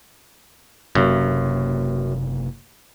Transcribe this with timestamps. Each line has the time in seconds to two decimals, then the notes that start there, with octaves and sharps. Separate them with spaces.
0.95 F#1 F#2 C3 A#3